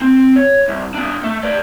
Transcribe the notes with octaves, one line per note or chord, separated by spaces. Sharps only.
C4
C#5
C2
B3 D4
A3
B4 D5